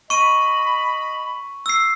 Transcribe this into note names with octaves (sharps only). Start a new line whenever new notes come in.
D#5 B5 C#6 D#7
E6 C7